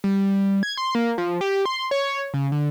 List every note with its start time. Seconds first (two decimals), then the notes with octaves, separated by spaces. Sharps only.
0.04 G3
0.63 G#6
0.77 C6
0.95 A#3
1.18 F3
1.41 G4
1.66 C6
1.91 C#5
2.34 C#3
2.52 D3